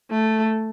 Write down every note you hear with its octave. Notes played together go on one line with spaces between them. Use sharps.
A3